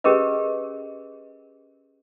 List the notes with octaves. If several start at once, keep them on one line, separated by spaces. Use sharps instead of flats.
C#4 G4 G#4 A#4 B4 D#5